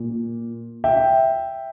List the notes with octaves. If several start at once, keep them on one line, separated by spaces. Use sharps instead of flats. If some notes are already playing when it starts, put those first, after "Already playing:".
Already playing: A#2
E5 G5